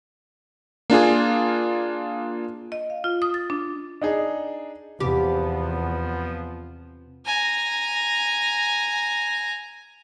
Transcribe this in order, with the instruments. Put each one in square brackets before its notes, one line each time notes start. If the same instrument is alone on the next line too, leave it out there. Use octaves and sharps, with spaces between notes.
[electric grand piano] A#3 D4 F4 G#4
[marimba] D#5
F5
F4
D#6
A6
D4
[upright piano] D4 D#4 G#4
[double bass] E2 [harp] C3 F4 B5 [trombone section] F3 B3 [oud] G4
[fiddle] G#5 A#5